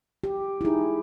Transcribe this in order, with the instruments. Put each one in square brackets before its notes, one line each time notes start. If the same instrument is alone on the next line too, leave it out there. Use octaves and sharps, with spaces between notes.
[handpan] G4
[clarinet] D#4 [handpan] E4 G#4